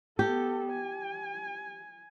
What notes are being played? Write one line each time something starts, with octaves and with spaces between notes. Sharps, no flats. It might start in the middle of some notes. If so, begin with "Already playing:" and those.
B3 G4 A4
G#5